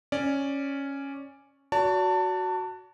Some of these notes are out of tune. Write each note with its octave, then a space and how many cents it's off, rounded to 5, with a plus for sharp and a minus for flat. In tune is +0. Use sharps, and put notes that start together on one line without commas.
C#4 -5 D5 +0
F#4 +0 D5 -45 A5 +25